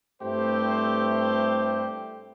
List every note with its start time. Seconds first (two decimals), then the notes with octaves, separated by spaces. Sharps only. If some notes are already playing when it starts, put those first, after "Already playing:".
0.22 G2 A3 C4 E4 G4 C5